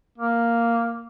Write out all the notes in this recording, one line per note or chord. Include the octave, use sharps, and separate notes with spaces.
A#3